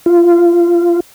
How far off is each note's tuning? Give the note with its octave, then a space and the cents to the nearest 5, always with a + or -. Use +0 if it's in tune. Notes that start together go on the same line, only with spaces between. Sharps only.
F4 -20